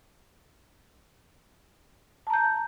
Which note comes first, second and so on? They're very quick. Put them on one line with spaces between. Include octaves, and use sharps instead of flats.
A5 A#5 G6